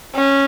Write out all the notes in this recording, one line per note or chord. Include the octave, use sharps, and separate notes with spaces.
C#4